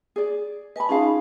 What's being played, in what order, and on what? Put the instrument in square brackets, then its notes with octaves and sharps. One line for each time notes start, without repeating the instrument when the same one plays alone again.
[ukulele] G#4 D5
[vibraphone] B4 G#5 A5 [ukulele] D#5 B5
[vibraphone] C#4 D#4 [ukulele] F4 G#4 F5